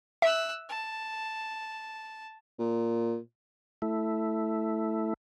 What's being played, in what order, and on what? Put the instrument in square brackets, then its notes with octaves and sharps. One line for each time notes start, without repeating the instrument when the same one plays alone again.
[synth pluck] E5 [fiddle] E6 F#6
[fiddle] A5
[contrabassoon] A#2
[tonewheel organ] A3 E4